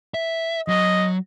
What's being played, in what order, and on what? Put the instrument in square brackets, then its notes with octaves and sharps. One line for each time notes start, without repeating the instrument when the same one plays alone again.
[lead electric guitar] E5
[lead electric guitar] F#3 [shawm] D#5